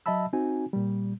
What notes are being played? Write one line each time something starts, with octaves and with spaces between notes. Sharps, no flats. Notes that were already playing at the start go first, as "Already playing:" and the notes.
F#3 D#5 E5 A5 B5 E6
C4 D#4 F#4 G#5
A#2 G3